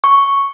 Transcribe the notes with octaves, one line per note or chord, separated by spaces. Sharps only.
C#6